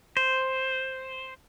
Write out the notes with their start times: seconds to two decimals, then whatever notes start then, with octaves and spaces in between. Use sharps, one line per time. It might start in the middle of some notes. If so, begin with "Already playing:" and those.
0.17 C5